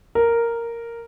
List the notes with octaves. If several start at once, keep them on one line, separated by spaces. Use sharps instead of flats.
A#4